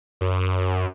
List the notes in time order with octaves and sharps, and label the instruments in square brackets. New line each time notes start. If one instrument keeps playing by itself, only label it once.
[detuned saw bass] F#2